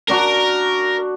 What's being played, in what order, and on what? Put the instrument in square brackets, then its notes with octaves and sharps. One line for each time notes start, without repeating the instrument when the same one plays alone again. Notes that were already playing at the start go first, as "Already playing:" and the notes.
[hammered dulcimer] D4 F#4 [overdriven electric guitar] A#4